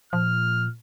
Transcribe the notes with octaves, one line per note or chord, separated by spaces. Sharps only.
A#2 F3 F6